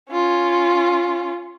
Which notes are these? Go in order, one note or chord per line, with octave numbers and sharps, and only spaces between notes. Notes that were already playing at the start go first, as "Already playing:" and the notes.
C#4 F4